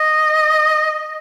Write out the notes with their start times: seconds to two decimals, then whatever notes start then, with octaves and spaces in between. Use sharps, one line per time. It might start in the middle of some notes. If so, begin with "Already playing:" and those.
Already playing: D#5